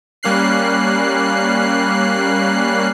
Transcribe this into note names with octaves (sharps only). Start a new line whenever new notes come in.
G3 A#3 C#4 F#6 C7